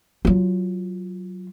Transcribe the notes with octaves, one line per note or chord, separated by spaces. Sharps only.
F#3 F4